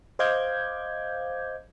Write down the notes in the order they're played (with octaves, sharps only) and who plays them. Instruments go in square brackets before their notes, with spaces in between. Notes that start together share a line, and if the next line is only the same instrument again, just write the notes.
[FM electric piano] C5 D#5 F5 D6 G6 G#6